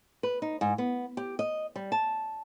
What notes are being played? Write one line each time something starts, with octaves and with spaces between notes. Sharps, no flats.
B4
D#4
G#2
B3
G4
D#5
G3
A5